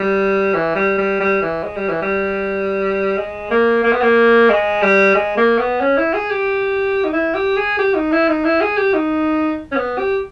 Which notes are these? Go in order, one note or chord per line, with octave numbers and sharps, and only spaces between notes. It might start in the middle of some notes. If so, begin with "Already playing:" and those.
Already playing: G3
E3
G3
G3
G3
E3
G#3
G3
E3
G3
G#3
A#3
A#3
B3
A#3
G#3
G3
G#3
A#3
B3
C#4
E4
G#4
G4
D#4
E4
G4
G#4
G4
D#4
E4
D#4
E4
G#4
G4
D#4
C#4
B3
G4